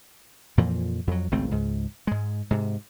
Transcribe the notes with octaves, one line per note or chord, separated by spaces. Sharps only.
F2 A#2 E3 F3
F2 F#3
G#1 C#2 A3 C4
C#2 G#2
G#2 G#3
G#2 C3